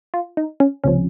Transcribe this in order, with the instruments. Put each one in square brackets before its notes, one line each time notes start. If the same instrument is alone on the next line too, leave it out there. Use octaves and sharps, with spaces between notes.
[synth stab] F4
D#4
C#4
C#2 C3 F3 C#4